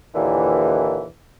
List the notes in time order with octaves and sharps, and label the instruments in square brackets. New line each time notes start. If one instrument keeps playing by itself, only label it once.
[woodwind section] D#2 A#2 D3 E3